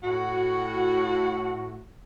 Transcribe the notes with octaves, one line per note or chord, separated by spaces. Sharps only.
A2 F#4